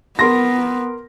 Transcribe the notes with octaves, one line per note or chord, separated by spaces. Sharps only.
B3 A#4 C6 A#6